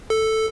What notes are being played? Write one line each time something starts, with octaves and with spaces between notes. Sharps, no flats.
A4